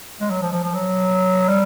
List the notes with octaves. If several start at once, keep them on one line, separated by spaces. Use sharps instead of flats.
G#3
F#3
F3
F3
F3
F#3
G3